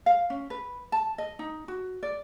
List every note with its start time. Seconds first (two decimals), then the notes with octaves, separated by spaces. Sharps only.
0.06 F5
0.30 C#4
0.50 B4
0.92 A5
1.18 D#5
1.39 D#4
1.68 F#4
2.03 D5